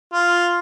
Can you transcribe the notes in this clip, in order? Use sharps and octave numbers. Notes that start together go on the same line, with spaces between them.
F4